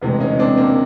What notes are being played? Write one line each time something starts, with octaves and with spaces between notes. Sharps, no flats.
E1 D2 C3 E3 G#3
C#4 D#4
C4 D4
A#3 C4